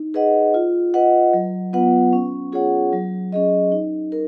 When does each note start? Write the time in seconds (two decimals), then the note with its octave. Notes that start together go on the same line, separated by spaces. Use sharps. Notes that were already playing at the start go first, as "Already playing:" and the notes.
Already playing: D#4
0.14 G#4 B4 D#5 F#5
0.54 F4
0.94 B4 D#5 F#5
1.33 F#3
1.73 B3 F4 B4 F#5
2.13 C#4
2.52 F4 G#4 C#5 F#5
2.93 F#3
3.32 C#4 G#4 D#5
3.72 D#4
4.12 A#4